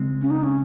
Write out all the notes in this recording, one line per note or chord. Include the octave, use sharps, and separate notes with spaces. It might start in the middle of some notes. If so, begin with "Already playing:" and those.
Already playing: C#3 G#3 C4
C#4
D#4
C#4